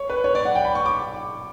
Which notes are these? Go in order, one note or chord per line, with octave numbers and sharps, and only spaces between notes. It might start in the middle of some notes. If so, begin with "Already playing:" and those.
Already playing: C#5
B4
C#5
D5
F#5
G5
B5
C#6
D6